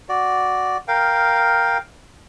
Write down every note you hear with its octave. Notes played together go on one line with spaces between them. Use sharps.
F#4 D5
A#4 F5 G5